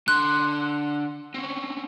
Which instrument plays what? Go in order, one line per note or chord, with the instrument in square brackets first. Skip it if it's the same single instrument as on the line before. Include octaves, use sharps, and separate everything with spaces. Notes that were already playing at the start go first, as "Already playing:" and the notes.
[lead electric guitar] D3 C6 [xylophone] F#6
[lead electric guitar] C4 C#4